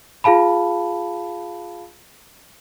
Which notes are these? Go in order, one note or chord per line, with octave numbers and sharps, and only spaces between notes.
F4 G#4 F5 A5 B5